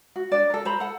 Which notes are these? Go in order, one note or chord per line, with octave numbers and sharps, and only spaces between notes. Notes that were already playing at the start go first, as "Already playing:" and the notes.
F#4
D4 D5
A4 A#4
C5 A#5 B5
A4 F#5